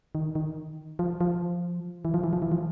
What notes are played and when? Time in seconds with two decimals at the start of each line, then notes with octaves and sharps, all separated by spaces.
0.15 D#3
0.35 D#3
0.99 F3
1.21 F3
2.05 E3
2.14 F3
2.24 E3
2.33 F3
2.42 E3
2.52 F3